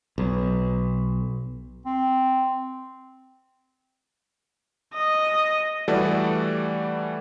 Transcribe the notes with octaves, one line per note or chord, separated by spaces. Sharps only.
B1
C4
D#5
E3 G3 A3 F#4 A4 D5